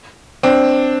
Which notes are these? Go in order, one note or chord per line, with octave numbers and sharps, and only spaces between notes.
C4 D4